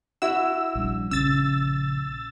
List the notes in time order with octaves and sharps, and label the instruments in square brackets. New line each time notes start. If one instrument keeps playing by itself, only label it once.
[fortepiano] E4 F#4 [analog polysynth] E6
[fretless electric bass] A#1 G3 D4
[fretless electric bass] A#1 C#3 C#4 [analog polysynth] E6 A6